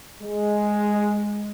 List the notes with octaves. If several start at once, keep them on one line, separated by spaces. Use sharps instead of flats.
G#3